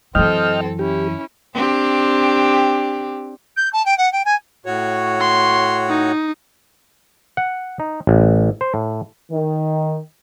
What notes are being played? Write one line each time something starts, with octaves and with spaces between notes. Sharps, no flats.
F#2 E3 C4 A4 D#5 G5 F6
C#4 E4 G4
C4 D4 G4
G6
A5
G5
F#5
G5
G#5
A2 F#4 C#5
C6
D#4
F#5
D#4
A1
C5
A2
D#3